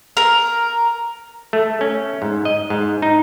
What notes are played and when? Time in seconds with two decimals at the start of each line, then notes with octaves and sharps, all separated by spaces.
0.17 A#4
1.53 A3
1.81 C#4
2.22 G#2
2.45 D#5
2.70 G#2
3.02 D#4